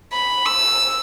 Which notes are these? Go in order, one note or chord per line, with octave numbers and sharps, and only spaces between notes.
B5
E6